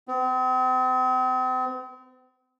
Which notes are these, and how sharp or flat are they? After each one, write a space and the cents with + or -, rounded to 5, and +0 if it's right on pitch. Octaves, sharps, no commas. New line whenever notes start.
C4 -40